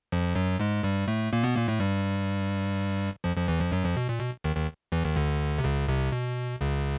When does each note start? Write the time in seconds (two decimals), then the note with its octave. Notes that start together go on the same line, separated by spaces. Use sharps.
0.12 F2 F3
0.35 F#2 F#3
0.59 G#2 G#3
0.83 G2 G3
1.07 A2 A3
1.33 A#2 A#3
1.43 B2 B3
1.55 A#2 A#3
1.68 A2 A3
1.80 G2 G3
3.24 F2 F3
3.36 F2 F3
3.48 E2 E3
3.60 F2 F3
3.72 F#2 F#3
3.85 F2 F3
3.96 B2
4.09 A#2
4.20 B2
4.44 D#2 D#3
4.56 D#2 D#3
4.92 E2 E3
5.05 D#2 D#3
5.16 D2 D3
5.58 C3
5.64 C#2 C#3
5.88 C2 C3
6.12 B2
6.61 C#2 C#3